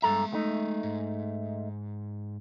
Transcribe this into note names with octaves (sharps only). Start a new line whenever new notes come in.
G2 G#3 A4 E5 A#5
A3 D#4
G#2